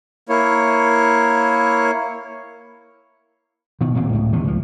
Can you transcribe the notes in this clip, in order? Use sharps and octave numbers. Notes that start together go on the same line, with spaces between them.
A#3 E4 C#5
B2 D#3
D#1 D2 A#2 C4
C#2 A2
D#2 C3 D#3 E3
C#2 F3